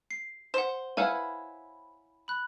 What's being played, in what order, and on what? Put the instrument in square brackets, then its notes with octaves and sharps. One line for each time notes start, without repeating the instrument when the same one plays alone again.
[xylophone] C7
[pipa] C5 [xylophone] F#5 E7
[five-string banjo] E4 B4 F5 [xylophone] C#5 F#5 G#5
[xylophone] B5 F#6